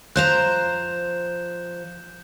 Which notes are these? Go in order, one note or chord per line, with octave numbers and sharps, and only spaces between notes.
F3 C5 A#5 F#6 G6 E7